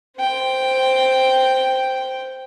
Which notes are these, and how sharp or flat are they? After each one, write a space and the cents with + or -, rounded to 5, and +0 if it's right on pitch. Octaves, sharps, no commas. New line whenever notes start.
C5 +0 G5 +0